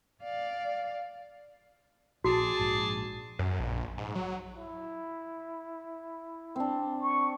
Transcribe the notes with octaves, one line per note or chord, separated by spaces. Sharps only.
D5 F5
A#1 F#4 G#4 D5 A5
A#1 G#2
F#2
A#1
G#2
F#3
E4
C4 D4
C#6